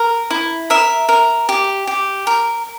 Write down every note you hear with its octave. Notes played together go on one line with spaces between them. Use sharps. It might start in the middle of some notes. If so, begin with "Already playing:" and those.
Already playing: A#4
E4
A#4 E5
A#4
G4
G4
A#4